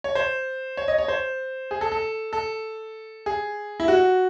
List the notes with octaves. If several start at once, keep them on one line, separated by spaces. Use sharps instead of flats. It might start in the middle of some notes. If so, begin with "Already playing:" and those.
C#5
C5
C#5
D#5
C#5
C5
G#4
A4
A4
A4
G#4
E4
F#4